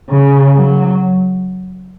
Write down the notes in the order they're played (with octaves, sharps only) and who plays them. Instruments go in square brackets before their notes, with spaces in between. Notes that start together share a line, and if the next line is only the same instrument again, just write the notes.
[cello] C#3
F#3